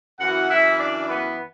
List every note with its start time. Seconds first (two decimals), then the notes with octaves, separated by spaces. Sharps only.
0.20 F#2 E3 F#4 F#5
0.49 E4 E5
0.79 D4 D5
1.08 B3 B4